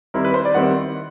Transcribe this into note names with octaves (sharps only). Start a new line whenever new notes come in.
D#3 G3 C4 E4 A#4
B4
C5
D5
D#3 G3 C4 E4 F#5